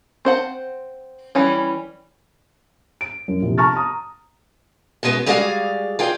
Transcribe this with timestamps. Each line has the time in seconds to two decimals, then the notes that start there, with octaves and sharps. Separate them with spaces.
0.25 C4 C5 F#5 A5
1.35 E3 G3 C#4
3.01 D7
3.28 F#2
3.42 A#1 C3
3.58 A5 A#5 C#6 F6 A6
3.75 A#5 D#6
5.03 F#2 B2 G#3 B3 E4
5.26 G3 G#3 F#4 G#4 D5 F5
5.99 F4 G#4 D5 G5